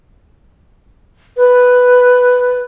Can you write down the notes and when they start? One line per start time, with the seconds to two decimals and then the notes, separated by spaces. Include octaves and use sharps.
1.37 B4